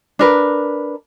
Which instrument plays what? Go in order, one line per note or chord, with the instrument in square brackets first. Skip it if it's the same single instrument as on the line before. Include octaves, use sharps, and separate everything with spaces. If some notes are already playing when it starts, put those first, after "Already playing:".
[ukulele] D4 A#4 B4